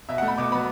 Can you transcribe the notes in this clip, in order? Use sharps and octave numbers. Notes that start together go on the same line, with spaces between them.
B2 E5
F#5
A3
B5
B2 D6
F#3 B3 B5